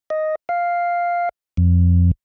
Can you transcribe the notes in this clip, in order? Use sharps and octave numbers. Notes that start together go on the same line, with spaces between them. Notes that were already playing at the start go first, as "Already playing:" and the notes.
D#5
F5
F2